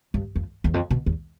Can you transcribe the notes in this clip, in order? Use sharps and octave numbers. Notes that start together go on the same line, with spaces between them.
G2
F2
E2
F2
B2
E2